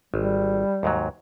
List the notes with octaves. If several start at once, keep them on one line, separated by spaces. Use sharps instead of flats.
G#1 G3
D#2 G#2 F#3